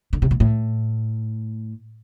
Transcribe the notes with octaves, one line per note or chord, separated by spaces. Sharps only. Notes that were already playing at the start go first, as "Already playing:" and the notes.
D3
C3
A#2
A2